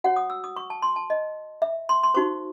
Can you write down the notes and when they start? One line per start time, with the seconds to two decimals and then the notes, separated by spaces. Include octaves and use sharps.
0.04 F#4 C#5 F#5
0.16 D#6
0.30 E6
0.44 D#6
0.56 C#6
0.70 A5
0.82 C6
0.96 A5
1.10 D#5
1.62 E5
1.89 C6
2.03 C6
2.14 D#4 F#4 C5 C#6